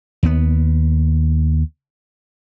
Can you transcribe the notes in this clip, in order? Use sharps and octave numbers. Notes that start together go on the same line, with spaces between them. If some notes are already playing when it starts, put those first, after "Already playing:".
D#2 B3